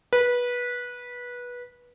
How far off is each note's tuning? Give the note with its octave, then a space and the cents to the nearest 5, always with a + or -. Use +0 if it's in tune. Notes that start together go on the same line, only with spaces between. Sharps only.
B4 -20